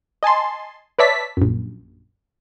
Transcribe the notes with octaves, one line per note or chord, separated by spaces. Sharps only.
D#5 G#5 A5 C6
B4 C#5 D5 E5 A5 B6
A#1 F#2